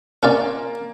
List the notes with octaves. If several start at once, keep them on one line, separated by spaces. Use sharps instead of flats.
A#3 C#4 F4 D5